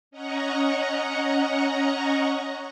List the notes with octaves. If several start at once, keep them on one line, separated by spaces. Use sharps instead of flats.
C#4 D#5 F#5 A#5 C#6